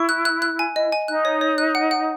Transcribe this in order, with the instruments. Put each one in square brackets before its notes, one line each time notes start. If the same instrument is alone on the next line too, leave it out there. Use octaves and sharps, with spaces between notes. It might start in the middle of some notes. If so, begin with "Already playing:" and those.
Already playing: [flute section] E4 [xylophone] C#6
[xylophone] F#6
F#6
F#6
G#5
D#5
G#5
[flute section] D#4 [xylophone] F#6
[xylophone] C#5
C#5
F#6
F#5
F#5